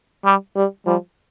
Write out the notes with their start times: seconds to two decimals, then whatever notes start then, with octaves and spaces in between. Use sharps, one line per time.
0.25 G3
0.56 G3
0.86 F3 G3